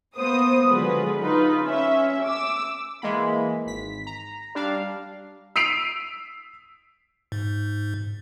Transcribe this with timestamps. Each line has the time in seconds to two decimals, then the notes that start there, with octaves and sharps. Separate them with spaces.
0.16 A#3 B3 C5 D#6
0.68 D3 F#3 G#3 F4 G#4 B4
1.21 D#4 F4 B4
1.64 C#4 E5
2.24 D6 E6
3.02 E3 G#3 A#3 B5
3.66 G#1 B6
4.07 A#5
4.55 G3 D4 F5
5.56 E6 B6 C7 D7 D#7 F7
7.32 G#2